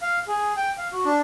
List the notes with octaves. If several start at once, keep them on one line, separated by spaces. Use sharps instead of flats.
F5
G#4
G5
F5
F#4
D4